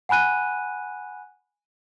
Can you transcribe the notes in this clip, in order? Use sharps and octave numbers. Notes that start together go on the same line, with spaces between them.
F#5 G#5 B5 F#6 D#7